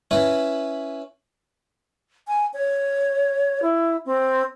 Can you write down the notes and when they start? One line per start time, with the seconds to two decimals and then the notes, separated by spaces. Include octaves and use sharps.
0.11 C#4 E4 B4
2.28 G#5
2.54 C#5
3.62 E4
4.06 C4